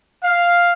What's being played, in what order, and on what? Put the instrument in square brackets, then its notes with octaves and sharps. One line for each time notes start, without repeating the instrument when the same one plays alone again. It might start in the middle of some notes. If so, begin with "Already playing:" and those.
[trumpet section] F5